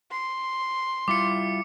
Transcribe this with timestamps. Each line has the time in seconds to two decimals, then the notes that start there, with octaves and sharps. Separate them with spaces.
0.11 C6
1.08 G3 E4 F4 D6 C#7